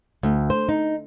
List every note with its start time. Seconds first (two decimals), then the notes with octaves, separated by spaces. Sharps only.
0.23 D2
0.50 C5
0.69 D#4